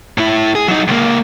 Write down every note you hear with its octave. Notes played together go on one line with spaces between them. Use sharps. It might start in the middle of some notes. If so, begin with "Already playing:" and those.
A2 E4
G#4
F#3 D#4
C#2 A#3